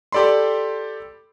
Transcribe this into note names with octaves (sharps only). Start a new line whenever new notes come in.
G4 A4 D5 B5 C6